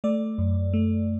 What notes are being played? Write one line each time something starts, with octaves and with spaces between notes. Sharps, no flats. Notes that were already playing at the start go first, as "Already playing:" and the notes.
A3 D5
F#2
A3